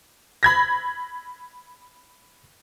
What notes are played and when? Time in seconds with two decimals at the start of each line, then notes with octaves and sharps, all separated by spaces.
0.43 B5 G#6 A#6